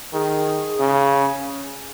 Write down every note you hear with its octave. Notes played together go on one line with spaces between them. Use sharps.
D#3 G#4
C#3